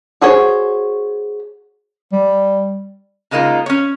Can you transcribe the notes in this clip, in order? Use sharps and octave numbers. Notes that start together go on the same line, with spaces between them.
F#4 G#4 C5 C#5
G3
C#3 G#3 A#3 D#4 F4
C#4 C#5